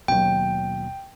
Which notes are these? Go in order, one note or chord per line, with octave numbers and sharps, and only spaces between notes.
D#2 B2 F#3 C#4 G5